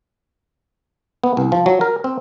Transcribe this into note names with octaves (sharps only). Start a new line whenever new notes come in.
B3
C2
F3
F#3
A#4
C4